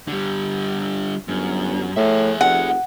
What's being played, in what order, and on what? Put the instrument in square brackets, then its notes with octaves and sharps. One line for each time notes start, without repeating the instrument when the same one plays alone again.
[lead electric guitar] D3 G3
[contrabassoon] G1 [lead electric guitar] F#2
[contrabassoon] A2 [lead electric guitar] G#4 E5
[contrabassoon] F1 [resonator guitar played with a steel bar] F#5